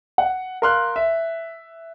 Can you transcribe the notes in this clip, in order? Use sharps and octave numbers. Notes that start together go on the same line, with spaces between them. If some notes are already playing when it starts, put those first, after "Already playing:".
F#5
A#4 F5 C6 F6 F#6
E5